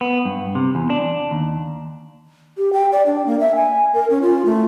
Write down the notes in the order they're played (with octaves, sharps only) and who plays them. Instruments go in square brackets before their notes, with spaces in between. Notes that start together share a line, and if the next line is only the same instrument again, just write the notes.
[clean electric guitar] B3
G2
C3
E2
D4
D#2
[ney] G4
G5
D5
D4
A#3
E5
G#5
A#4
C#4
F4
A3